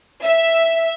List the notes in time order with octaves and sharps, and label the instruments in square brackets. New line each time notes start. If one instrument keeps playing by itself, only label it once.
[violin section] E5